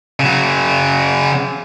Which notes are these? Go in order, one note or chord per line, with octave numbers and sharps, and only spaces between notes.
C#3 F#3